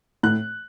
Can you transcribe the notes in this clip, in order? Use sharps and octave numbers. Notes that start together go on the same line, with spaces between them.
A2 F#6